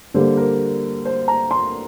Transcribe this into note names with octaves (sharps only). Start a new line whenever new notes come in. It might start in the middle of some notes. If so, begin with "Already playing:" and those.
D3 G3 A#3 C5
A#4
C5
A#5
C6